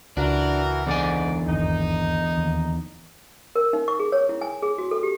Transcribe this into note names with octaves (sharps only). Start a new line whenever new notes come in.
C#2 E3 D4 F#4 A#4
E2 G#2 D3 D5 G#5
G1 D#2 D#4
D#2
A#4
D#4
C#6
G#4
C#5
E4
G#5
G#4
F#4
A4
G4